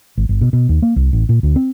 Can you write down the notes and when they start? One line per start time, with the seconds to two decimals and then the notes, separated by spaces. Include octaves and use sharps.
0.17 G#1
0.29 G1
0.41 B2
0.53 B2
0.69 D#2
0.82 A#3
0.96 C2
1.13 A1
1.29 A#2
1.43 D2
1.56 C4